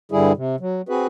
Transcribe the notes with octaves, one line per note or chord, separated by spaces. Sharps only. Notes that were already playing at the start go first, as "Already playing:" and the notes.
G2 D3 G3 E4 G#4
C3
F#3
C4 F#4 G#4 B4